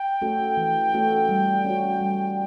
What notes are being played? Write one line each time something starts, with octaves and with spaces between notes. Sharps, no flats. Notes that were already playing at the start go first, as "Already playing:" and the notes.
Already playing: G5
A3 C#4 F#4 A4
E3
A3 C#4 F#4 A4
G3
C#4 F#4
G3